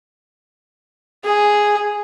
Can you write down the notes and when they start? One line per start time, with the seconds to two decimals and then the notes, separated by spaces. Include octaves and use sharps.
1.25 G#4